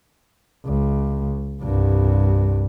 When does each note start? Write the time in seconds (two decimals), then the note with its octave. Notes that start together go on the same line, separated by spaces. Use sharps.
0.65 C#2
1.61 C2 G2